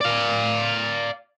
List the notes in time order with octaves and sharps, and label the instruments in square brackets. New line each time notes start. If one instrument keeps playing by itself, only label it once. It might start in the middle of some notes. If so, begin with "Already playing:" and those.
[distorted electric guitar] D5 F5